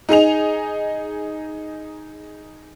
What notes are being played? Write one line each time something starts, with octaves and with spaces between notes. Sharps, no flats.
D#4 G#4 D#5 F7